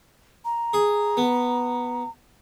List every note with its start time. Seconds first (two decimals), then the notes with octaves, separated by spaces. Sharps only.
0.45 A#5
0.73 G#4
1.17 B3